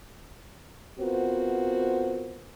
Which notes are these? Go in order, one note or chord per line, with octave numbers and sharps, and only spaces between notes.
B3 C4 F4 F#4 A#4 C5